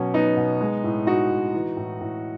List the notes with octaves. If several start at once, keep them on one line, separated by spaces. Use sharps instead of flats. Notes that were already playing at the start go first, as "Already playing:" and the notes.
Already playing: B2 F#3 C#4
F#3 B3 D#4
B2
G#3
A2
G#3 D#4 F#4
A2
E3
A2
A2